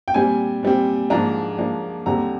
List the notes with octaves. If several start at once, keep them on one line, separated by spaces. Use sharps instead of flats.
G5
A#2 G3 C4 G#5
A#2 G3 C4
G#2 F3 A#3 D4 A#5
G#2 F3 A#3 D4
D#2 D3 G3 C4 A#5